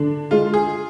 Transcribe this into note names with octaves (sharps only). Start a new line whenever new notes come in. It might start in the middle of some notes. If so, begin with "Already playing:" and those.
Already playing: D3 D4
G#3 F4
G#4